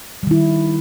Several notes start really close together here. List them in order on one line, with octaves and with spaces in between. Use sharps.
G3 D#3 E4